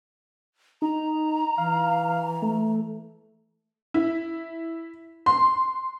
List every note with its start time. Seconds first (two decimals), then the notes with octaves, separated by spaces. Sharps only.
0.82 D#4 A#5
1.58 E3 F5
2.42 A3
3.94 E4
5.26 C6